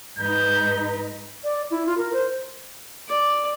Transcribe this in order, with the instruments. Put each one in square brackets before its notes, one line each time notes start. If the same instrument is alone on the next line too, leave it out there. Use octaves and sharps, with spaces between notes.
[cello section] G#2 D#4 B4 [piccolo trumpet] G6
[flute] D5
E4
F4
A#4
C5
[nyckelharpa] D5